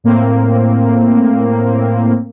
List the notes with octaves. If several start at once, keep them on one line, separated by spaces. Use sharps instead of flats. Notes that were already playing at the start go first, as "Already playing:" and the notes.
A2 A#3 C4